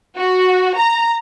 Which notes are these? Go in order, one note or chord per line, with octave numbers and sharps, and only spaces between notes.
F#4
A#5